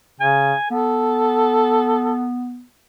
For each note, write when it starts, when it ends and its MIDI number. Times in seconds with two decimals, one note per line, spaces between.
0.20 0.54 49
0.20 0.69 80
0.70 2.63 59
0.70 2.25 69